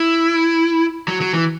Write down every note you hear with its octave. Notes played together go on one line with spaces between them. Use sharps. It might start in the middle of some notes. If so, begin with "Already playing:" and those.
Already playing: E4
F#3
F#3
E3